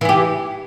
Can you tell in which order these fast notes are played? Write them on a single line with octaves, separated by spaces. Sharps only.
E3 E4 G4